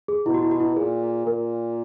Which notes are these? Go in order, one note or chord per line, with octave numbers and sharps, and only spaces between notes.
G#4
B2 E4
F#4
E4
F#4
E4
A#2 G#4
A#2 A#4